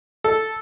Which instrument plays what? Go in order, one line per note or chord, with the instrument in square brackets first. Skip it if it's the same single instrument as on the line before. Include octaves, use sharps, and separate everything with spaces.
[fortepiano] A4